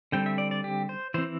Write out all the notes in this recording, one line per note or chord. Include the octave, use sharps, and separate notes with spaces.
D3 G3 C4 G5
E5
D5
D5
G4
C5
E3 C4 C5